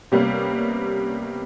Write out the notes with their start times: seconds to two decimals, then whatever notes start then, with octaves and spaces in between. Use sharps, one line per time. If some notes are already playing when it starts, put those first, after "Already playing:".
0.12 C3 G3 A#3 B3 C#4